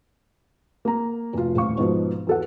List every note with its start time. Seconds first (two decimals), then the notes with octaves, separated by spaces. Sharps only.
0.85 A#3 A#5
1.33 F1 F4
1.55 D#1 A1 F5 C#6
1.77 G#2 B2 F3
2.27 E2 A4 F#5